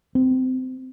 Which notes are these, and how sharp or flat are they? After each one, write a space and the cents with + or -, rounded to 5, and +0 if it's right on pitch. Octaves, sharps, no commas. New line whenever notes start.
C4 -25